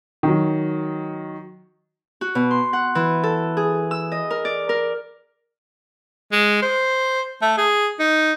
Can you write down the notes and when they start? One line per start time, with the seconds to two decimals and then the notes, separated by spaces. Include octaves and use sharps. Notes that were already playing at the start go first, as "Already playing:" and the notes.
0.23 D#3 F#3
2.21 F#4
2.35 B2
2.51 C6
2.73 F#5
2.95 E3
3.23 A4
3.57 G#4
3.91 E6
4.12 D#5
4.30 A#4
4.45 D5
4.69 A#4
6.32 G#3
6.62 C5
7.42 A3
7.57 G#4
8.00 D#4